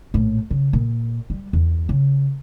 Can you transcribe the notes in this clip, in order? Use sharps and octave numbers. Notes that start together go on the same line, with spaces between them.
A#1 A2
C#3
A#2
G3
E2
C#3